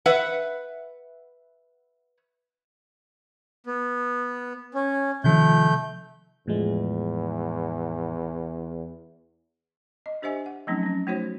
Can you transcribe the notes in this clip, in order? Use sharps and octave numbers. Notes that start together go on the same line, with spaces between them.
B4 E5 F#5
B3
C#4
C3 D#3 F3 A3 G6
E2 A2 F3 G#3
D#5
D4 G4 C5 D#5 E5 G#5
F#5
F3 F#3 A3 C4 C#4 D#4
C4 C#4
A3 D#4 F#4 C5 C#5